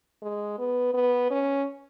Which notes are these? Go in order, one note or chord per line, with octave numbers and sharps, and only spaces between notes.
G#3
B3
B3
C#4